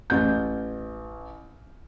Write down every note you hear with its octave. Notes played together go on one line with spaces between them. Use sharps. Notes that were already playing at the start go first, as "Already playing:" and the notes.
A1 G6